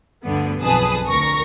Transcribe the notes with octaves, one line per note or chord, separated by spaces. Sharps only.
D2 G2 D3 B3
B1 F2 G#4 B4 A5 D#6
D2 A#4 C#6 A#6